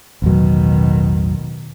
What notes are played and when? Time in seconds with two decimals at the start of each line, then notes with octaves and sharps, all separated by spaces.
0.22 A1 E2 B2 D#3 F#3